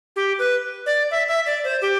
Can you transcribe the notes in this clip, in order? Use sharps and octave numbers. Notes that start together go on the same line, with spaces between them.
G4
B4
D5
E5
E5
D5
C5
G4